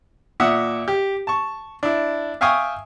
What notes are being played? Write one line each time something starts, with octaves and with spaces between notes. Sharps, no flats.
A#2 E5 F#5 D#6
G4
A5 C#6
D4 E4
E5 F5 G5 G#5 C#6 D#6